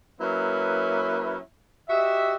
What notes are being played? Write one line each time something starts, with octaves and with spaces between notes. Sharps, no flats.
F#3 A#3 C#4 E4 B4
F#4 G4 D#5 E5